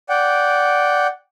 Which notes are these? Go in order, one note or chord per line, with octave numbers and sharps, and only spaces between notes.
D5 F#5 G5